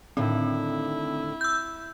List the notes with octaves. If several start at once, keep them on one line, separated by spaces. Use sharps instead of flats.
A2 D3 D#3 C4 E4
E6 G6